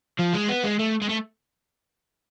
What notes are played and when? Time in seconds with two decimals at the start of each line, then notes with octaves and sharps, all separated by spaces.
0.19 F3
0.33 G#3
0.48 B3
0.64 G#3
0.79 A3
1.02 G#3
1.09 A3